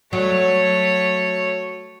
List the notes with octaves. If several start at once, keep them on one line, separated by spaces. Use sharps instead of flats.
F#3 A3 C#5